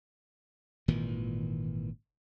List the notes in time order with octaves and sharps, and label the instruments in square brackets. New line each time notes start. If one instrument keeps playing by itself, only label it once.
[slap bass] G#1 A#2 D#3 E3